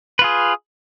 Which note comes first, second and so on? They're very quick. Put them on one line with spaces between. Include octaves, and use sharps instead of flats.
B4 F4 G#4